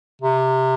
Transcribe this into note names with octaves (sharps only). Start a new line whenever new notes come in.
C3